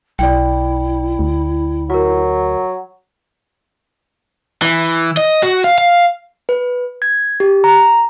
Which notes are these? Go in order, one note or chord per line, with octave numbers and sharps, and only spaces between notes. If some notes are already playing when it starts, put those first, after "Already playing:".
B1 E4 D5 G5
D2
F#3 F#4 A#4
E3
D#5
F#4
F5
F5
B4
G#6
G4
A#5